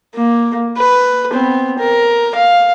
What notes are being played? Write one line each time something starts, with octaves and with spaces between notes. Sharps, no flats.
A#3
B4
B3 C4
A#4
F5